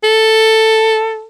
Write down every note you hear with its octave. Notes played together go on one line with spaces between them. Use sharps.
A4